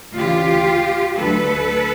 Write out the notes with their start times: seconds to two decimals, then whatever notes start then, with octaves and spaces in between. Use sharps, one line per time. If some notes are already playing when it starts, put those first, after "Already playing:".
0.15 D2 C#3 E3 F4 G4
1.16 D2 D3 F#3 A3 A4 B4